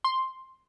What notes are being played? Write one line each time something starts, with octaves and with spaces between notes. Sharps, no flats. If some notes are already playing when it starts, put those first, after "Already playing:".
C6